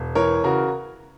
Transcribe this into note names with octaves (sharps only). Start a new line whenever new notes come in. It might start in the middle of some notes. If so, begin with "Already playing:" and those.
Already playing: E1
E3 A#4 C#5
C#3 F#4 A#4